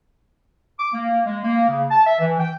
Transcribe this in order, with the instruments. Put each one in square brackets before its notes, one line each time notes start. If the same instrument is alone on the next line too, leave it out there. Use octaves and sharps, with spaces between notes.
[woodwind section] D6
A#3
G#3
A#3
C#3
A5
E5
E3
G5